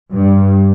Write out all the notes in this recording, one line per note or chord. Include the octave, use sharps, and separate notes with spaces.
G2